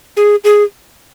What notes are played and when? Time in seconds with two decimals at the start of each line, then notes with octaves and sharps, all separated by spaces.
0.17 G#4
0.44 G#4